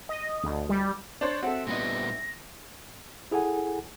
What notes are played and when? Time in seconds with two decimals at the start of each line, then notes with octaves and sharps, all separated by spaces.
0.09 D#5
0.44 D2
0.69 G3
1.21 D4 C5 C#5 A6
1.43 C4 F#4 A4 E5 F#5
1.67 A#2 G3 B3 D4 E4 D#5 A#6
3.31 E4 G#4 A4 F#5 G#5